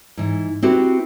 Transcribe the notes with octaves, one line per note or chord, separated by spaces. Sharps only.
G#2 E3
C4 E4 F#4 G4 B4